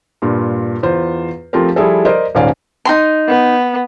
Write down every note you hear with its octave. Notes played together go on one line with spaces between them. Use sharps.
G2 A#2 F4
E2 F4 C5
F3 A3 C4 F4 G4 A#4
F3 G3 E4 G#4 A4
A#4 C5 D5 D#5
D#1 G#2 C#4 D5 F5 G#5
D#4 F4 C6
B3